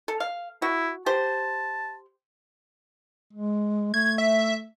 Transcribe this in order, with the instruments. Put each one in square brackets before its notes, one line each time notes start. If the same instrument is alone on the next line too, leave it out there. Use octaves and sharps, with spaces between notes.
[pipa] A4
F5
[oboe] E4 [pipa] F#4
[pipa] G4 C5 [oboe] A5
[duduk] G#3
[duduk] A3 [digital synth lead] G#6
[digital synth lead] E5